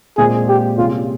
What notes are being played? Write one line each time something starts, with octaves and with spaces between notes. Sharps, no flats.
A#2 G#3 C4 F4 G#4 C5
G4
C3 G3 A#3 C#4 F4 G#4